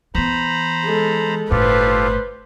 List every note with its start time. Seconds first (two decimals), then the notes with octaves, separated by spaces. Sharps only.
0.15 E3 B3 C5 A#5 B5
0.86 G#3 A4
1.51 G1 A2 F4 G4 A4 B4 C5